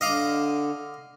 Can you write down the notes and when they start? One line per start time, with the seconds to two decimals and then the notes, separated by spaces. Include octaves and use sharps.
0.01 D3 D#5 F5 D6